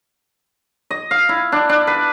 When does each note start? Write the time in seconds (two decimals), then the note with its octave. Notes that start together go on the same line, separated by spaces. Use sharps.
0.91 D#5
1.11 F5
1.29 E4
1.52 D4
1.69 D4
1.87 B4